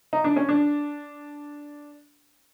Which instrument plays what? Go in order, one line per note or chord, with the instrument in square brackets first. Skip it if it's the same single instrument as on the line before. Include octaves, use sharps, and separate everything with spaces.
[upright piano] D#4
D4
C#4
D4